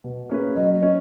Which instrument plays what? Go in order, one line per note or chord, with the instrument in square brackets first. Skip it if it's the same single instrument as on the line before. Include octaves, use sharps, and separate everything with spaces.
[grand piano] B2
A#3 C#4 G#4 B4
[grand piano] F#3 [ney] D#5
[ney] D#5
[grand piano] C#4